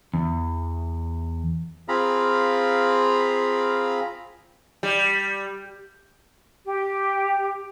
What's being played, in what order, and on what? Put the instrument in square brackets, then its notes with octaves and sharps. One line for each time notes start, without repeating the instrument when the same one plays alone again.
[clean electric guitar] E2
[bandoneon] C4 F4 G#4 F5 A#5 B5
[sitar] G3
[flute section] G4